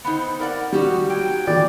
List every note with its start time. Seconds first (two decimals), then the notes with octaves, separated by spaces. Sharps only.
0.04 B3 C4 D#4
0.40 A#4 D5 F#5
0.73 G3 D#4 F#4 G4
1.10 F#3 G5
1.47 E3 D5